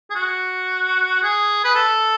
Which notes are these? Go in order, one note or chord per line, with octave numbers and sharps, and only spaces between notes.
G#4
F#4
G#4
B4
A4